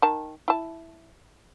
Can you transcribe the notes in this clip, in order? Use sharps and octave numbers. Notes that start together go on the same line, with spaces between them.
D#3 A5
E4 A5